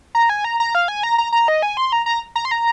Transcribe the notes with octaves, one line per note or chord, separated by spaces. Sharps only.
A#5
G#5
A#5
A#5
F5
G#5
A#5
A#5
A#5
D#5
G#5
C6
A#5
A#5
A#5
C6
A#5